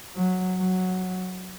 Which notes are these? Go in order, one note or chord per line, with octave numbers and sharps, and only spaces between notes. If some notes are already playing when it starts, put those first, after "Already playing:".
F#3
F#3